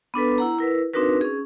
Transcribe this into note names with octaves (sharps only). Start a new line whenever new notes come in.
B3 D4 A4 B4
E4 F#5 A#5
E4 A#4 B4
C4 D4 D#4 F#4 A#4 B4
C#4 G#4